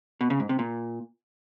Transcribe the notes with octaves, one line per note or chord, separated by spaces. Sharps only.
B2
C#3
G#2
C3
A#2